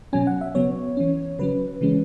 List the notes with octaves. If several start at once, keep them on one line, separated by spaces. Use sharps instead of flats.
B2 F#3 C#4 G#5
F#5
E5
C#3 F#3 B3 C#5
E3 C#4
C#3 F#3 C#4 B4
C#3 E3 G#3 C#4